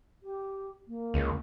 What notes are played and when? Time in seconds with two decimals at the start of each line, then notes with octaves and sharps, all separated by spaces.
0.23 G4
0.88 A#3
1.14 C#2